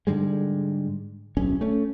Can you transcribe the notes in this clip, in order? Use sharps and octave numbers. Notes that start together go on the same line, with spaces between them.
G#2 D3 G3 G#3
D1 B1 C#4
A3 C#4